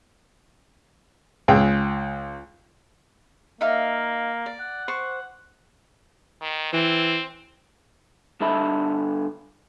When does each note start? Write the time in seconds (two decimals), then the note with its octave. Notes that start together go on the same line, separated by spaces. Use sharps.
1.48 C#2 G#4 G5
3.61 A#3 D#4 E5 F5
4.46 D5
4.60 F#5
4.88 C5 C#6 D6
6.42 D#3
6.73 E3 C4
8.40 G2 D3 A4 E5 B5